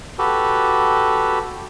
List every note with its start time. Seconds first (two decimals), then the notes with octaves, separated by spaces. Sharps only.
0.18 F#4 G4 A4 B4